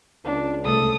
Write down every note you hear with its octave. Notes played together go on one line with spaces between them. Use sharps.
C#2 D4
C2 A3 A4 D#6